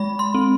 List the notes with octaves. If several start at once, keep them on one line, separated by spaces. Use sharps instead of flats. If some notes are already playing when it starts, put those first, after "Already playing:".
Already playing: G#3 B5
C6
C4